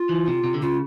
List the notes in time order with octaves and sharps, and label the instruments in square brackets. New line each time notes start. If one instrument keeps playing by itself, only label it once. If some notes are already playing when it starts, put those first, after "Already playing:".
Already playing: [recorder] F4
[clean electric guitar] E3
C3
C3
D3
[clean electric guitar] C#3 [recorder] F4